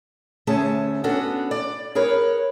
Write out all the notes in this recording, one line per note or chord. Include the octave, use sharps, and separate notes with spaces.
D2 A3 C#4 G#4 A5
B3 C#4 D4 F#4 A4
D5
G#4 A#4 B4 C#5